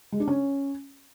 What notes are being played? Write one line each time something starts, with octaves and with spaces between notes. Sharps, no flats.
G#3
D4
C#4